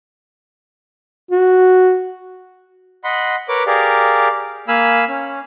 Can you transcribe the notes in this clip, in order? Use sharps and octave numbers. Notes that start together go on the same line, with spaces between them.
F#4
D#5 F#5 B5 C6
A#4 B4 C#5 D6
G4 G#4 A#4 D5 F5
A#3 F5 G#5 B5 E6
C#4